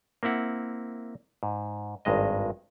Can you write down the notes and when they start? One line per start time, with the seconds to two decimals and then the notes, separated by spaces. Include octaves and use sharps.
0.23 A#3 C4 E4 F#5
1.43 G#2
2.05 G#1 G2 G#3 D#5